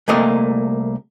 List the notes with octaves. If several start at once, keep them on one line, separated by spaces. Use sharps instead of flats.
C2 A3 A#3 D#5